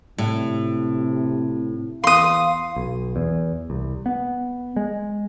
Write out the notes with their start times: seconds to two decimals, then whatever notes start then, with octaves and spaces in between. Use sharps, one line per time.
0.18 A2 C3
2.04 E2 F5 C6 D#6
2.76 B1
3.16 E2
3.70 C2
4.06 B3
4.76 G#3